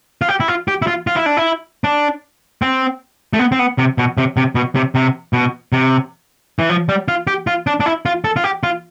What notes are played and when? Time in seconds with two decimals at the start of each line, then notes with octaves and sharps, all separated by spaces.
0.22 F4
0.29 G4
0.40 E4
0.48 F4
0.68 G4
0.82 E4
0.87 F4
1.07 F4
1.16 E4
1.26 D4
1.37 E4
1.84 D4
2.62 C4
3.33 A3
3.39 B3
3.52 C4
3.59 B3
3.78 C3
3.98 B2
4.18 C3
4.37 C3
4.55 B2
4.75 C3
4.95 C3
5.33 B2
5.72 C3
6.59 E3
6.69 F3
6.89 G3
7.08 F4
7.27 G4
7.47 F4
7.67 D4
7.80 D4
7.86 E4
8.06 F4
8.24 A4
8.36 F4
8.44 G4
8.63 F4